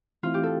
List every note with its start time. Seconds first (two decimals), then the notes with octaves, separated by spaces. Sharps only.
0.23 E3 A3 C4 E4 F4
0.34 G4
0.43 A4